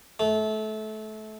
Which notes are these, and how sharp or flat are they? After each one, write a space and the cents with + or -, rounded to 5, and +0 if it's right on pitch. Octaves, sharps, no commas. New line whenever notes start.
A3 -25